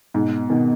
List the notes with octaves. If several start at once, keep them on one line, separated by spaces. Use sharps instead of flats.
G#2 B2
B2 D#3